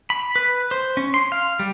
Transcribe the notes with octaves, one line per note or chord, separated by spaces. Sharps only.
B5
B4
C5
C#4
C6
F5
G3